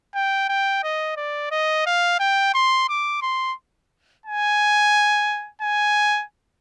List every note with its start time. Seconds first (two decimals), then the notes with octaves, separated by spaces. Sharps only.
0.14 G5
0.49 G5
0.84 D#5
1.17 D5
1.51 D#5
1.86 F5
2.20 G5
2.54 C6
2.89 D6
3.22 C6
4.26 G#5
5.62 G#5